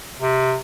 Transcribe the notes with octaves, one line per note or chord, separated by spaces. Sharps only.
C3